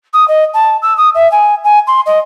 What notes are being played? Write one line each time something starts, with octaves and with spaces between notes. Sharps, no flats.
D#6
D#5
A5
E6
D#6
E5
G#5
G#5
C6
D#5